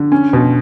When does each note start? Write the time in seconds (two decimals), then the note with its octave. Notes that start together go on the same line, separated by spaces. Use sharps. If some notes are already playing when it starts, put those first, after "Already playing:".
Already playing: D3
0.12 C#4
0.33 B2